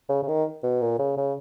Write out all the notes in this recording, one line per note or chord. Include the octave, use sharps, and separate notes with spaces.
C#3
C#3
D#3
B2
A#2
C#3
C#3